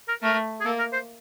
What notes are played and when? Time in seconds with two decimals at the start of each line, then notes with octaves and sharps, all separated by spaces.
0.09 A#4
0.22 A3 A#4
0.61 G#4
0.65 A#3 A4
0.79 A#4
0.93 C5